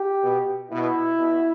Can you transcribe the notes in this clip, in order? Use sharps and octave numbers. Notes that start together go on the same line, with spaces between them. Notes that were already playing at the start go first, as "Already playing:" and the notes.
Already playing: G4
B2
B2 E4
B2